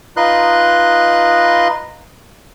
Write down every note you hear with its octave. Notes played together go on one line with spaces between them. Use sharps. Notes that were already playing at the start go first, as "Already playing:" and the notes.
D#4 F4 B4 D#5 C6 F#6